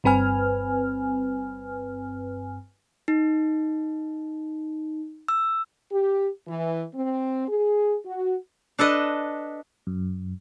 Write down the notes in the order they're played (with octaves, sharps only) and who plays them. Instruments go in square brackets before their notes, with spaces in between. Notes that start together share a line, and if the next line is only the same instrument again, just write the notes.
[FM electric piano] G1 G2 C4 B4 G#5 F6
[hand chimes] D#4
E6
[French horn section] G4
E3
C4
G#4
F#4
[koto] D4 A4 B4 D#5
[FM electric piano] F#2